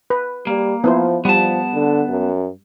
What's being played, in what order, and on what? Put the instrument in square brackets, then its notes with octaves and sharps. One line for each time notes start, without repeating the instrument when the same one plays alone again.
[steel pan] B4
[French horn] G3 [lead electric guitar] A#3
[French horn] F3 [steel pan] B3 E4 C5
[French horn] F3 [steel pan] G3 [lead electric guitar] B3 A5
[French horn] D3
F#2